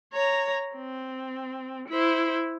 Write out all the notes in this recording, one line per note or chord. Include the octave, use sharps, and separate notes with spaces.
C#5 A#5
C4
E4 C5